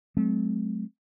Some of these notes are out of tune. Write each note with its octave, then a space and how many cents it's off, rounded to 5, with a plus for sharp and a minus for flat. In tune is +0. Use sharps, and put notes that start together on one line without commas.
F#3 +0 A3 -40 C4 +0